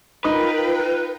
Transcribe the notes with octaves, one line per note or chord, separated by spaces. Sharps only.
D#4 F4 A#4 B4 G5 D#6